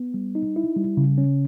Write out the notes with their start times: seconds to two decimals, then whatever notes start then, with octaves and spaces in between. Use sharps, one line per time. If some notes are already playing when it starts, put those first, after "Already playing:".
Already playing: B3
0.14 G3
0.35 D#4
0.56 E4
0.76 G3
0.97 C#3
1.18 C#4